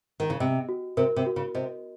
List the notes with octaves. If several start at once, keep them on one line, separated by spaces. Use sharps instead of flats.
D#3
C#3
C3 D#5
F#4
C3 A#4
C3
F#4
C#3
C3 D#5